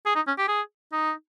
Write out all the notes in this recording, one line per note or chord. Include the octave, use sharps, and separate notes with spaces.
G#4
D#4
C#4
G4
G#4
D#4